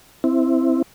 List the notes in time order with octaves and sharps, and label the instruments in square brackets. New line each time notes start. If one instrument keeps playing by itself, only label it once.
[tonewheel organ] C4 E4